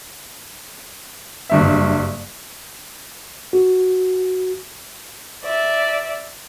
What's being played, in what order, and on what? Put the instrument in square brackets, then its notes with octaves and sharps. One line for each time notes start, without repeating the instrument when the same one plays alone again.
[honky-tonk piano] F#1 G2 E5
[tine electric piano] F#4
[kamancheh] D5 E5